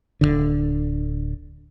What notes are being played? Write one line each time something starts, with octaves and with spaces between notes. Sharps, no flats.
D1 B1 D3